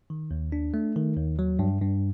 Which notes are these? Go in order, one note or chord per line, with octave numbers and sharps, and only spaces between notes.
D#3
D#2
D4
A3
D#3
D#2
F#3
G2
G2